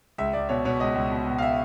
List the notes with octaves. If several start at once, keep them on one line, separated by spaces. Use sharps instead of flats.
C#2 E5
C#2 D5
B2 C#5
B2 C#5
C#2 D#5
C#2
B2
B2
F5
E5